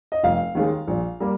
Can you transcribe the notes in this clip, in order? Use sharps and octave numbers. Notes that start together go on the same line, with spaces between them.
D#5
F1 F5
D#2 D#3 G#3
A#1
G3 A#3